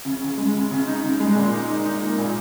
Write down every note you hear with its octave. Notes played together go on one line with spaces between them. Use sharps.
C#3
C#3
G#3
C#3
C#3
D#4
C#3
G#3
A#2
D#4
D#4
D#4
A#3
A#2